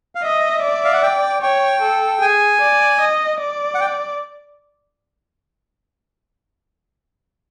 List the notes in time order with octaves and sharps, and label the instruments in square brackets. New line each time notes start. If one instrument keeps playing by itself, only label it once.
[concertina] F5
[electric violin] D#5 [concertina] E5
[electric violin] D5
[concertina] F5
F#5
G5
[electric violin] C#5 [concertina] G5
[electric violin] A4
[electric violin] G#4 [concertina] G#5
[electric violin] D5
D#5
D5
[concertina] F#5
G5